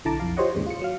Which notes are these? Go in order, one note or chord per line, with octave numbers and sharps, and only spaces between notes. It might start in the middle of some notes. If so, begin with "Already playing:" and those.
B1 D3 E4 A5 A#5 D6
B1 F2 F5
F4 G4 C5 C#5 D#5 F#5
D#2 G#2 C#3 E3
F4 C#7
F#3 F5